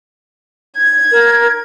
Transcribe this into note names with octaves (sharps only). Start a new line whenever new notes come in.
G#6
A#4